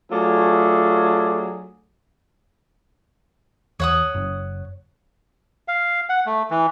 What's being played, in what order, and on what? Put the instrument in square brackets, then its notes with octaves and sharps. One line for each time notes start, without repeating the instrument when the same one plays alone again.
[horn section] F#3 A3 D4 F4 G#4
[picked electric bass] E2 [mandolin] C#5 F#5 D#6
[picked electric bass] F#1
[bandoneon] F5
F#5
A3
E3